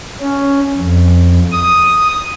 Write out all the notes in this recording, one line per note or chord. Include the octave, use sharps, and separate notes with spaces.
C#4
F2
D#6